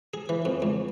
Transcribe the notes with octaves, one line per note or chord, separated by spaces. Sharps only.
G#4
E3
F2
C#2